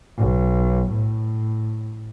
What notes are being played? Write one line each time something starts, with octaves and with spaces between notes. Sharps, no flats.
B1
A2